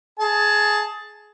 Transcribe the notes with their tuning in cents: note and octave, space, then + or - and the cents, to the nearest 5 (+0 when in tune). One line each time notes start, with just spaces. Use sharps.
G#4 +15 A5 +0